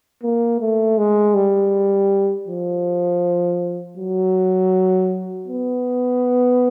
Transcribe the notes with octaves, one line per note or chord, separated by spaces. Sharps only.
A#3
A3
G#3
G3
F3
F#3
B3